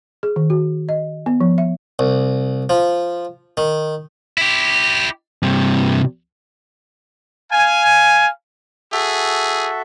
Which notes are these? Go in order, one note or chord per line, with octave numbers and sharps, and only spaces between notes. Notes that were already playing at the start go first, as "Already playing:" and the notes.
G#4
D#3
F#4
D#5
B3
F3
E5
C2
F3
D#3
E4 G4
G2 C3
F5 G#5
F#4 G#4 A4 E5